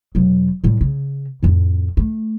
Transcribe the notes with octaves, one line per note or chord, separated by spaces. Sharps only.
E1 F#3
A2 G3
C#3
F2 A2
A3